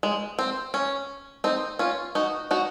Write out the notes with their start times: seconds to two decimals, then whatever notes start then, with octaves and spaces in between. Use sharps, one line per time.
0.03 G#3
0.39 C4
0.74 C#4
1.44 C4 D#4
1.79 C#4 F4
2.15 D#4 F#4
2.51 D#4 F#4